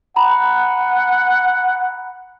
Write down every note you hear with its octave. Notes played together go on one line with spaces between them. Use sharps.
F#5 A#5 B5